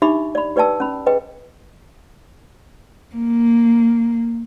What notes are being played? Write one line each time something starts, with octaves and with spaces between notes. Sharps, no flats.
D4 D#4 G4 E5 B5 D6
D5 B5
G4 B4 D5 G5 A5 E6
C#4 B5
G#4 B4 D#5 G5
A#3